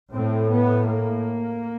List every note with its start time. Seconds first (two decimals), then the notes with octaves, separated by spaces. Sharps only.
0.11 A2 C4
0.50 B3
0.88 A#3